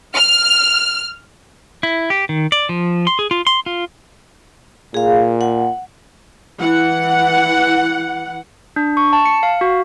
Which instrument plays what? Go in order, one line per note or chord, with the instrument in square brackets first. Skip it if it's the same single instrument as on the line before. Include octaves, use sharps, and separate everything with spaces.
[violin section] F6
[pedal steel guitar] E4
G4
D#3
D5
F3
C6
G#4
F4
C6
F4
[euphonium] A#2 [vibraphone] G#4 F5
[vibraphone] F#5
[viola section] E3 F#5
[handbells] D4
C#6
A5
C#7
F5
F#4